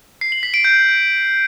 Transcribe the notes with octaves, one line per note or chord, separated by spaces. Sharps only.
C7
F#7
B6
D7
G6